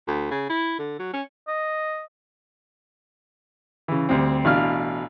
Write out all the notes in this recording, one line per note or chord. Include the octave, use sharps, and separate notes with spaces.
D2
C#3
E4
D3
F#3
C#4
D#5
C#3 E3
D2 G3 C4
A1 B2 D4 F5 F6